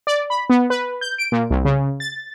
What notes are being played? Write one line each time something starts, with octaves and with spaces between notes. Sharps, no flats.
D5
B5
B3
B4
G6
D7
A#2
C2
C#3
A6